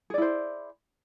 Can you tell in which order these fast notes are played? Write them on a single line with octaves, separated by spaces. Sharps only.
G#4 D5 E4 C5